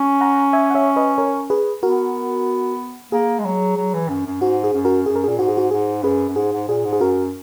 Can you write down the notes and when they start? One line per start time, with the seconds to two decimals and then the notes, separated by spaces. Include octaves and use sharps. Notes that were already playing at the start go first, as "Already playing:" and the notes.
Already playing: C#4
0.21 F#5 A#5
0.53 E5 G#5
0.70 F#5
0.75 C#5 E5
0.96 B4 D#5
1.18 A#4 C#5
1.50 G#4 B4
1.83 B3 F#4 A#4
3.12 A#3 G#4
3.39 G#3
3.45 F#3
3.77 F#3
3.94 E3
4.09 F#2
4.26 F#2
4.41 G#2 F#4
4.64 G#4
4.74 F#2
4.85 F#4 A#4
5.06 F#2 G#4
5.16 A#4
5.24 A#2 G#4
5.38 G#2 F#4
5.48 G#4
5.57 F#4
5.71 G#2 G#4
6.03 F#2 G#4 B4
6.29 F#2
6.36 G#2 G#4
6.52 G#2
6.68 A#2 G#4
6.85 G#2
6.93 G#4
7.01 F#2 F#4 A#4